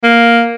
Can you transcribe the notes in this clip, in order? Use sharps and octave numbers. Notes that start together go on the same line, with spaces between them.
A#3